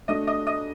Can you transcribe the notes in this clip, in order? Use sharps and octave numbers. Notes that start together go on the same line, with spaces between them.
A3 D4 F#4 D#5 D#6
D#5 D#6
D#5 D#6